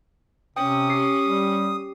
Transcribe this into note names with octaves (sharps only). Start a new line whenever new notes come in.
C3 C#4 G5 D#6
G4 C7
G3